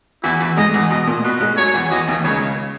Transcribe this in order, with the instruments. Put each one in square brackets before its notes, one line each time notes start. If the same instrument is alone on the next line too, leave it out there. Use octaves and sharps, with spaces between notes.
[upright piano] E2 E3 [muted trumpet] E4
[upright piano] E2 E3
[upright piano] G#2 G#3 [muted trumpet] D#5
[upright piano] E2 E3
[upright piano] B2 [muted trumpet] D#5
[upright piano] A#2
[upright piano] B2 [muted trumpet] B4
[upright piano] G#2 G#3
[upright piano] F#2 F#3 [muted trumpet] C#5
[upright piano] E2 E3
[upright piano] E2 E3 [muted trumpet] D#5
[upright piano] D#2 D#3
[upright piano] C#2 C#3 [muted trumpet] C#5